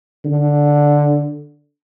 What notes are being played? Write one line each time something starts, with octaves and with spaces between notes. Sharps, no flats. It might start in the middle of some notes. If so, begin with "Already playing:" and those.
D3